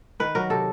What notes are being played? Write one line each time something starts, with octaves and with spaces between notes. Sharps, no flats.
D#3 B4
F#3 A#4
C3 A4